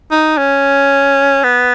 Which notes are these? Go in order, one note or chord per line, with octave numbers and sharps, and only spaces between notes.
D#4
C#4
B3